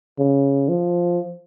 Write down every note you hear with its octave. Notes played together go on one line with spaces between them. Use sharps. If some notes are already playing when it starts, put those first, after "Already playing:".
C#3
F3